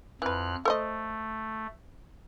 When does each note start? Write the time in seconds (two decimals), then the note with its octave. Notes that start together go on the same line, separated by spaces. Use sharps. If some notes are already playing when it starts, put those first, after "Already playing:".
0.22 F2 E3 B4 F6 F#6
0.65 A3 A4 C5 D#5